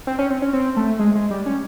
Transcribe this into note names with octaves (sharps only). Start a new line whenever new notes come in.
C4
C#4
C4
C#4
C4
A3
G#3
G#3
G3
C#4